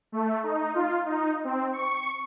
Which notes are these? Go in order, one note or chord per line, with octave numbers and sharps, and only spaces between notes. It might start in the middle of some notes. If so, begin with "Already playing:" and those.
A3
D#4
F4
D#4
C4
C#6